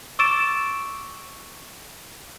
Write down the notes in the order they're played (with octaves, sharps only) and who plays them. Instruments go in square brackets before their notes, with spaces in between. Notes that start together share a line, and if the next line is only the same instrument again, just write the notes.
[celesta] C#6 D6 E6 A6 D7 E7